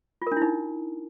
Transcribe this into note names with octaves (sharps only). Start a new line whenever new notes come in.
F4
A#4
D4
E4
D#4